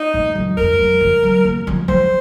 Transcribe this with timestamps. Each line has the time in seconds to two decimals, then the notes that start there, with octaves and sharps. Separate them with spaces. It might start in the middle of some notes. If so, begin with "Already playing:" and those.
Already playing: D#4
0.14 A#2
0.35 F#2
0.57 F2 A#4
0.79 F#2
1.01 F3
1.23 F#3
1.44 A#3
1.67 F3
1.88 F3 C5